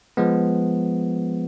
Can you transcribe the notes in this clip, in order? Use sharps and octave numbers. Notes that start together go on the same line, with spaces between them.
F3 G#3 B3